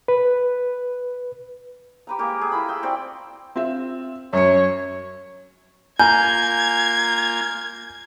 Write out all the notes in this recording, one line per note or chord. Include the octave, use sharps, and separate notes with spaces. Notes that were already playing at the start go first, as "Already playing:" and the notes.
B4
G4 B4 A#5
G#3 A#3 G4 A#4
A3 G#4
E4 F4 A#4 B5
G5 E6
C4 F#4 D5 G5
C4 F4 E5
F#2 C#5 C#7
A#3 F4 G#5 A#5 G6 G#6